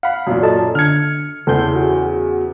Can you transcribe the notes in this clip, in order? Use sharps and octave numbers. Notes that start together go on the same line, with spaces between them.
F5 F#5 B5
F#2 A#2
A4 D#5 A5
D3 F6 G#6 C#7
E2 C#3 E4 A4 C6 G6
F#4 G#4